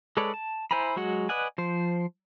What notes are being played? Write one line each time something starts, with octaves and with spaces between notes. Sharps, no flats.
G#3 A4 B4 C#5 D5
A5
E4 C5 G#5 A#5 B5
F#3 G#3 F#4 F#5
B4 D5 D#5 F#5 G#5
F3 C5